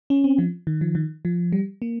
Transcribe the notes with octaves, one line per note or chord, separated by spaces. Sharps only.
C#4
C4
F3
D#3
F3
D#3
F3
G3
A#3